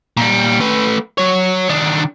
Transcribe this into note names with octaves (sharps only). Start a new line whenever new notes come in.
A#2 G3
A3 B4
F#3 C#5
D#3 D4